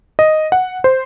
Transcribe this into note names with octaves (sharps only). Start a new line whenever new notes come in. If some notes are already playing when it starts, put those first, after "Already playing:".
D#5
F#5
C5